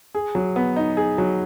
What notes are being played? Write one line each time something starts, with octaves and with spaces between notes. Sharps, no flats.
G#4
F#3
B3
D#4
G#4
F#3